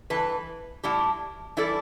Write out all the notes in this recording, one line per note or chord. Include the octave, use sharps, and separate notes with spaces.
G2 E3 B4
A2 G3 E4 G4
E3 G3 E4 A4 D5